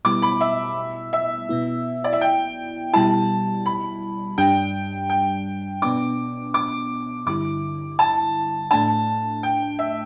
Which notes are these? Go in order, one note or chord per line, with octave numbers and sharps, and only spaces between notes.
B2 G3 B3 E4 D6
B5
E5
E5
B2 B3 E4
D5
E5
G5
B2 G3 E4 A5
B5
G2 G3 D4 G5
G5
B2 B3 D4 D6
D6
G2 D3 G3 E4 D6
A5
A2 A3 D4 A5
G5
E5